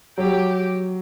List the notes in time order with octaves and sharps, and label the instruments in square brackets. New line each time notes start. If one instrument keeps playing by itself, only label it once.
[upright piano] F#3 [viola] G4